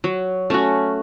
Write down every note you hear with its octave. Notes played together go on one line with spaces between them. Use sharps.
F#3
A3 C#4 F#4